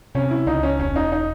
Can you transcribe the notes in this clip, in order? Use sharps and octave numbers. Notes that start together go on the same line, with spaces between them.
C3 C#4
E4
C#2 D#4
C#4
E1 C#4
D#4
D#4